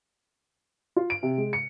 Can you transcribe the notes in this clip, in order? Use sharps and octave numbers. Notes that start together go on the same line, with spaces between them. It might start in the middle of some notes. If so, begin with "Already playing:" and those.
F4
D7
C3
G#3
C#7